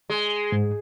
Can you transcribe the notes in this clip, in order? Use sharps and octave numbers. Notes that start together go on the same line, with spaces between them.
G#3
G#2